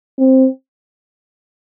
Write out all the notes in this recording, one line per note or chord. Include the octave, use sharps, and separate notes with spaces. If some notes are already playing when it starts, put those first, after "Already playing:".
C4